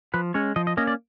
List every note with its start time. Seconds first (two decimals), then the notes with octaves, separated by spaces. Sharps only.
0.14 F3 B4
0.34 G#3 C#4 C#5
0.56 F3 D#5
0.67 D#5
0.77 A#3 C#4 D#5
0.87 D5